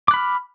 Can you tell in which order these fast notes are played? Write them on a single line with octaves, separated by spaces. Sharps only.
D6 F#6 B5 F6